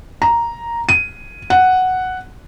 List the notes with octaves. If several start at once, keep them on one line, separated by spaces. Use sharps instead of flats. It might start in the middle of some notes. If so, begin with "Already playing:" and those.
A#5
D#7
F#5